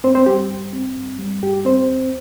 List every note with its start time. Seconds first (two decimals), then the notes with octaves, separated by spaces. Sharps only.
0.04 G2 C4 C5
0.15 C4 C5
0.26 G3 G4
0.50 G2
0.73 C4
0.97 G2
1.19 G3
1.42 G2 G4
1.65 C4 C5
1.88 D#2